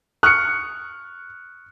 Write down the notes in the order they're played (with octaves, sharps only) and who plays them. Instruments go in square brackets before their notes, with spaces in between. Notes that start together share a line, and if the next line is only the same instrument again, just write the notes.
[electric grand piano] C#6 D#6 F6 [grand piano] F#6 C#7